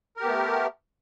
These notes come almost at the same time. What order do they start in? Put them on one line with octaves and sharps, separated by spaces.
A#4 G4 B3 A3